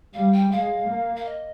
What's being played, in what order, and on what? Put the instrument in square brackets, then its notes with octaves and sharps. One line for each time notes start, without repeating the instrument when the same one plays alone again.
[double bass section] G3 [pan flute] F5
[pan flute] G5
[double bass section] G#3 [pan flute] F5
[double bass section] A#3
[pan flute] F5
D#5